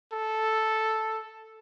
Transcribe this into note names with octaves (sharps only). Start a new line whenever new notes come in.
A4